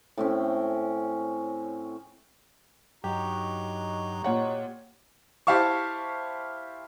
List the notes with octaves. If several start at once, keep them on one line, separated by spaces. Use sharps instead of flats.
A2 C4 C#4
G2 F#3 D#4 F#4 G4
A#2 C#5 F#5
E4 G4 C5 F5 A5 C#6